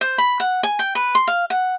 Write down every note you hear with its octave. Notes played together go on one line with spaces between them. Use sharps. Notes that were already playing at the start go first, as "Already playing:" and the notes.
C5
B5
F#5
G#5
G5
B4
C6
F5
F#5